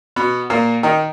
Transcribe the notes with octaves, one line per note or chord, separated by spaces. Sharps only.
B2 B3
A#2 A#3
D#3 D#4